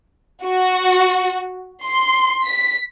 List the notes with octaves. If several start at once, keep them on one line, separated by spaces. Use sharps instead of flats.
F#4
C6
B6